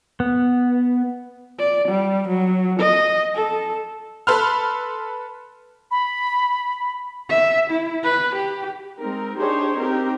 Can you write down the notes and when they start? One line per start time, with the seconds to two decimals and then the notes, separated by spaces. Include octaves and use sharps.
0.20 B3
1.60 D5
1.89 G3
2.29 F#3
2.80 D#5
3.35 A4
4.27 A4 B4 B5 C6 E6 F6
5.91 B5
7.30 E5
7.71 E4
8.04 B4
8.35 G4
8.98 G#3 C4 D#4 A#4
9.37 D4 D#4 G4 G#4 C5 C#5
9.76 C4 D#4 G4 A#4